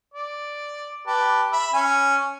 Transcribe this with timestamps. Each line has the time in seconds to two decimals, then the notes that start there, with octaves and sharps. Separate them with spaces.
0.14 D5
1.07 G4 B4 A5
1.52 E5 B5
1.74 C#4 G#5